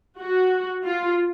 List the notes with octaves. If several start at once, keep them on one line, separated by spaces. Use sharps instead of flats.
F#4
F4